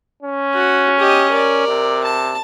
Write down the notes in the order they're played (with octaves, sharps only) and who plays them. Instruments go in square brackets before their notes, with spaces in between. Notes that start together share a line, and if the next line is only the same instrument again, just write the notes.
[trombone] C#4
[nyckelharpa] F#4
G4 D#5
A#4 D5
[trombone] C3
[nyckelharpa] A5